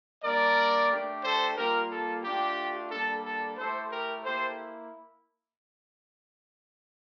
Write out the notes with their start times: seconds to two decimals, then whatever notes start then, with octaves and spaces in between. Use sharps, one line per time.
0.24 G3 A#3 D4 A#4 D5
0.91 A3 D4 G4
1.24 A4 C5
1.57 G3 A#3 F4 G4 A#4
1.91 A4
2.24 A3 D4 F4 G4
2.90 G3 A#3 D4 A4
3.24 A4
3.57 A3 E4 G4 A4 C5
3.90 G4 A#4
4.24 A#3 E4 G4 A4 C5